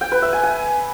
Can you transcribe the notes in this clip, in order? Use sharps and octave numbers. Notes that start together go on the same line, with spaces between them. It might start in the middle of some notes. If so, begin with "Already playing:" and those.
G5
B4
E5
G#5
G#5